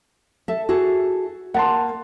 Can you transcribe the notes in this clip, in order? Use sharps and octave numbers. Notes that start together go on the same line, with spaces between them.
A4 E5
F#4 G#4 A4
A#3 F#5 A5 C6